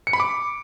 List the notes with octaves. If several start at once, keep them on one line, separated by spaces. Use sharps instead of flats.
C#7
B5
D6